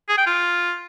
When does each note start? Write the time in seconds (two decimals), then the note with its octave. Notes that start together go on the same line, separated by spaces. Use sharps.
0.09 G#4
0.18 G5
0.27 F4